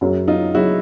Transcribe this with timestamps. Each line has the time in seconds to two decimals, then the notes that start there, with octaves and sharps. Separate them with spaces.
0.01 F#2 C#3 F#3
0.28 D#4 F4
0.55 C#3 F#3 E4 F#4